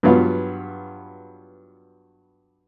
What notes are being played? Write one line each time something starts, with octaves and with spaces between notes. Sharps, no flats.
G2 F#3 B3 F4